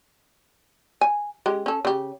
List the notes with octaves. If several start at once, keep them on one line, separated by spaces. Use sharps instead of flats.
G#5
G#3 C#4 G4
C#4 A4
C#3 G4